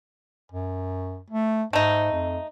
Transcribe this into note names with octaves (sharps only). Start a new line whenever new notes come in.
F#2
A3
G#2 A3 D#4
F2